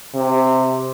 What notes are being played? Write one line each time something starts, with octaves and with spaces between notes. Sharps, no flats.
C3